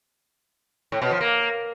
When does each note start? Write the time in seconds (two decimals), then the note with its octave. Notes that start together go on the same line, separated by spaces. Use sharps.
0.92 A2
1.02 B2
1.11 F3
1.21 A#3